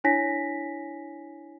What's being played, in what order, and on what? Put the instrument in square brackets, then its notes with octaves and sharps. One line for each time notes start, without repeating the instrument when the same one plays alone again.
[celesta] D4 E4 C#5 G#5 A#6 B6